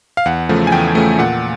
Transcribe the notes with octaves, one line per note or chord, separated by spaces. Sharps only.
F5
E2 F#5
C#3 F3 A3
G#5
E2 G5
C#3 F3 A3
A#2 F#5